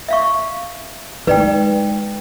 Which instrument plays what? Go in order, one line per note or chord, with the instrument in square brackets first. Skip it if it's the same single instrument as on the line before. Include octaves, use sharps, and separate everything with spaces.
[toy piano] E5 F5 C#6
[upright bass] G#3 D#4 [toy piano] B4 D5 G5